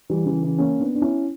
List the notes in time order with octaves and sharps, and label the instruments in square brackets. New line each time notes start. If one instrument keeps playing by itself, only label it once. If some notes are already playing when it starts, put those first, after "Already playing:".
[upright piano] E3 G3
C#3 E3
C#3 E3
A#3 C#4
B3 D4
D4
C#4 E4